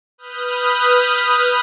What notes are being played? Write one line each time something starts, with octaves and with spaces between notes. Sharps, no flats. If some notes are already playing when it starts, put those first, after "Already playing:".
B4 B5 D#6 F6 G6